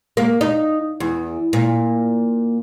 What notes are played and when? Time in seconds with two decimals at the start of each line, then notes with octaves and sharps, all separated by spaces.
0.17 A#3
0.41 D#4
1.00 E2
1.53 A#2